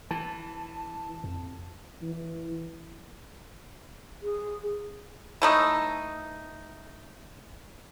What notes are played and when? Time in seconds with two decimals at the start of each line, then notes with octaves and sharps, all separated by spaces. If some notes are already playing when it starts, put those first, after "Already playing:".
0.11 E3 A5
1.24 F2
2.02 E3
4.23 G#4
5.42 E3 A3 D#4